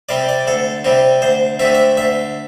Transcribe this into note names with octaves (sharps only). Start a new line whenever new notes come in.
C3 G3 C4 D5
D5
D2 A4
C3 G3 C4
D2 C5
D3 A3 C4 E5
E5
D2 E5